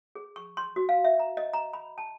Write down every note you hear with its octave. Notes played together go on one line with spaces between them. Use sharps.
G#4
C#6
C6
F#4
F5
E5
A#5
D#5
A#5
B5
A5